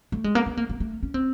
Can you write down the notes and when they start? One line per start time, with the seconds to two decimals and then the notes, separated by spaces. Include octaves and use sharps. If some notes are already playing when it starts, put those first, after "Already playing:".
0.12 A3
0.24 G#3
0.35 A#3
0.46 B3
0.57 A#3
0.69 A#3
0.80 A3
1.03 C#4
1.14 C4